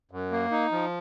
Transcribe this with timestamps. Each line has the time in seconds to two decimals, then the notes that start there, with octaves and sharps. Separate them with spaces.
0.11 F#2
0.32 A#3
0.51 D#4
0.72 F3